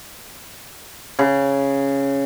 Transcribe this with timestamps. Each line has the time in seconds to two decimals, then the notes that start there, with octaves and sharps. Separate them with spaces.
1.19 C#3